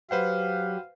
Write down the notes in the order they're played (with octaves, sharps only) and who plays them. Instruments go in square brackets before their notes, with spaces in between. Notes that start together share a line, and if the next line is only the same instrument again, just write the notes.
[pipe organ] F#3 G4 [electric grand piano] B4 C5 F#5 [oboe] F5